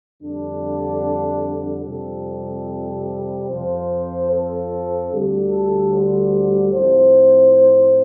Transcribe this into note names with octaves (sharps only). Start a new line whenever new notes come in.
F2 D3 G3 D4
F2 C3 G3 A4
F2 F3 C4 C5
A4
D2 D3 G3
A4
C5
A2 F3 C4 C5